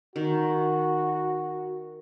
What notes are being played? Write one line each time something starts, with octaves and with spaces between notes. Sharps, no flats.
D#3 F#4